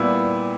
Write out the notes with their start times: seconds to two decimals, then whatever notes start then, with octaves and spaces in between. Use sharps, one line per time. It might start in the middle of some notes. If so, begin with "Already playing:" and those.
Already playing: A#2 G3 B3 E4